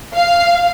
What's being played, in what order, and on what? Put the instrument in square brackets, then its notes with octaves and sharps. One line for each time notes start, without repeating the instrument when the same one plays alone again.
[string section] F5